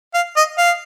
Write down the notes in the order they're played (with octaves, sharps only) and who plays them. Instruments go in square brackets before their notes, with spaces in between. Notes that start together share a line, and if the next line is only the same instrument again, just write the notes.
[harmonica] F5
D#5
F5